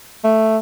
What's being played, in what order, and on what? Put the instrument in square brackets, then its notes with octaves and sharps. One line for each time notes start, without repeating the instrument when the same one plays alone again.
[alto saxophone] A3